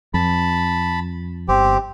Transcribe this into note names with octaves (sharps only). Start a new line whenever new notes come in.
F2 A5 B5
G1 C4 G4